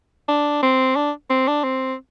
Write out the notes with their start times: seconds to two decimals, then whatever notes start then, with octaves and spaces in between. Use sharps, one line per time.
0.28 D4
0.63 C4
0.96 D4
1.30 C4
1.48 D4
1.64 C4